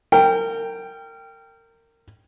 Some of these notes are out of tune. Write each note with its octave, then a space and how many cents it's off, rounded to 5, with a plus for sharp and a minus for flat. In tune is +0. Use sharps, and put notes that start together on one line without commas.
A#4 -30 G5 +0